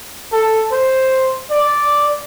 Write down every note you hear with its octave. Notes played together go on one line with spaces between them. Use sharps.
A4
C5
D5